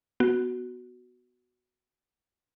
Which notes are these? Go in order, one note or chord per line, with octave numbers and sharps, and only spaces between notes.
B3 F#4